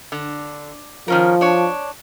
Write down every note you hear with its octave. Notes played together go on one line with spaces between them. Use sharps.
D3
D#3 F3 C#4 A#4
D4 C#5